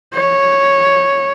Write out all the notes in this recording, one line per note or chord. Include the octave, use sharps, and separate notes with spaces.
C#5